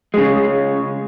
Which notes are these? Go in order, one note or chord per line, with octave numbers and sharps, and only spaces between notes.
C#3 G#3